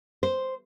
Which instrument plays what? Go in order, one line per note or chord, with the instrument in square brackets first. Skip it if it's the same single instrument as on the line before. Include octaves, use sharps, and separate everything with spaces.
[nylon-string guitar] C5